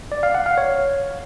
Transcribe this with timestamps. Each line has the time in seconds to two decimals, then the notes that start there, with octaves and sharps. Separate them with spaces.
0.12 D5
0.23 F5
0.35 F#5
0.46 F5
0.58 C#5